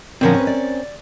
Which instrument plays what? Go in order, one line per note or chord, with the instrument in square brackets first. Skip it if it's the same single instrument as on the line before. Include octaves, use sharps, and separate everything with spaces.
[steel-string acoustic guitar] A#2 D3 F3 [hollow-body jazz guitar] C4 C#4 A#4
[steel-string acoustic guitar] B4 C#5
D5